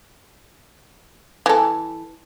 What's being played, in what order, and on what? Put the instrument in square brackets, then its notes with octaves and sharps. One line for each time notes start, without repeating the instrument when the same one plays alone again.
[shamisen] E3 A4